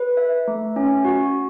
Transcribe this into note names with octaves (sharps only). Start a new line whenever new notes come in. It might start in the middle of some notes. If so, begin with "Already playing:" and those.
Already playing: B4
E5
A3
C#4
F#4